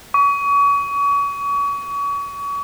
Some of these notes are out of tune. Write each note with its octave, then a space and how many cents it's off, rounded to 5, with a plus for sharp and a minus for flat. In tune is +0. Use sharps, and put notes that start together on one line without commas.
C#6 +35